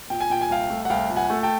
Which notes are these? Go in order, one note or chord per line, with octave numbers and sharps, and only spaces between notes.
A#2 G5
G#5
A#2 G5
G#5
C2 F5 G5
A3
F#5
C2 F5 G5
A#2
F#5 G#5
A3
G5 A5